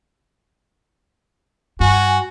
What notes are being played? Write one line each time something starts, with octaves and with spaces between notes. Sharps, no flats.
G2 F#4 G#5